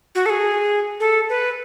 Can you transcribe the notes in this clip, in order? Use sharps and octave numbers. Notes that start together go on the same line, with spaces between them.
F#4
A4
G#4
A4
B4